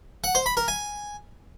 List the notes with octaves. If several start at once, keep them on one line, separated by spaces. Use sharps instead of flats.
F#5
C5
B5
A#4
G#5